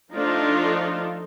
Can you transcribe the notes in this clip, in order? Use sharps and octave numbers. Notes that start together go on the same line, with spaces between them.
F3 A3 D4 D#4 F4 A4